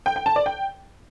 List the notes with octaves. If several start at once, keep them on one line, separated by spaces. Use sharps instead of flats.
G5
G5
A5
D5
G5